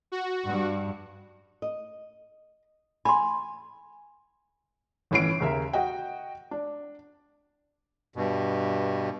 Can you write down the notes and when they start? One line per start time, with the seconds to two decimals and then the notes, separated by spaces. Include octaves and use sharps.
0.12 F#4
0.46 G2
1.62 D#5
3.05 G#5 B5 C6
5.11 G1 A2 E3 C#4 C7 D7
5.40 D#2 C#3 A#4 E5
5.73 F#4 D#5 G5
6.51 D4
8.16 G2 B2